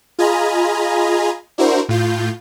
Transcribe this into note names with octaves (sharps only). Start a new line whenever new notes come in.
F4 G#4 D#5 G#5 A#5 B5
D4 E4 F#4 A#4 C5
A2 F4 G6